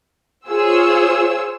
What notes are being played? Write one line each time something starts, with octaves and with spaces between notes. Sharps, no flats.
F4 G#4 C5 C#5 E6